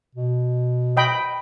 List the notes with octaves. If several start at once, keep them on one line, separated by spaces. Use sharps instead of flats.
B2
D#5 G5 B5